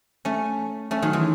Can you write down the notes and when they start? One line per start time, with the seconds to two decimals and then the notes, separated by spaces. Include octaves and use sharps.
0.25 A3 C#4
0.91 A3 C#4
1.02 D#3 F#3
1.13 E3 G#3